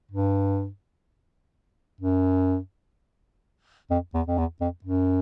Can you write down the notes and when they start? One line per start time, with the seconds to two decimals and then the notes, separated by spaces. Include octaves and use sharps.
0.11 G2
2.01 F#2
3.91 F2
4.14 E2
4.28 F2
4.38 E2
4.61 F2
4.84 F#2